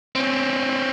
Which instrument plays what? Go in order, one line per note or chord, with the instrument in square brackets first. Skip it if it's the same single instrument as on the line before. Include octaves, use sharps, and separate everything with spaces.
[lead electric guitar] C4 C#4